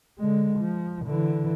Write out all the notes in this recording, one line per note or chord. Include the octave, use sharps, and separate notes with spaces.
D3 G#3
F3
D3 E3